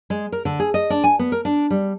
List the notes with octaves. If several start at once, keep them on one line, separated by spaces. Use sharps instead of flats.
G#3
A#4
D3
G#4
D#5
D4
G#5
B3
A#4
D4
G3